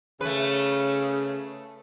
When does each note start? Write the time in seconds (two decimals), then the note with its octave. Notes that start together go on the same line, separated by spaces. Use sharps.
0.21 C#3 A3 B4